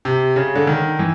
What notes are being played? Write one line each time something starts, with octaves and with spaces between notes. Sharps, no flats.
C3
C#3
D3
D#3
E3